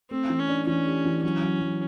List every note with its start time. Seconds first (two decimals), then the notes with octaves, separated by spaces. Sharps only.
0.10 A3 C4
0.29 E3
0.39 C#4
0.49 D4
0.67 E3 C#4
0.86 G4
1.05 E3
1.24 F#3 C#4
1.42 F#3
1.61 F#3